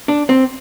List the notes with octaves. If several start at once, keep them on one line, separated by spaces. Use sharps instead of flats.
D4
C4